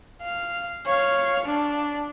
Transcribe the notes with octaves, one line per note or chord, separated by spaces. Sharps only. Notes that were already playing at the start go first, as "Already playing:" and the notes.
F5
C#5 F5
D4